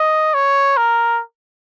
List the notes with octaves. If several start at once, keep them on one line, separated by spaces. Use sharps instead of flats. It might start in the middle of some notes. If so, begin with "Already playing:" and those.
Already playing: D#5
C#5
A#4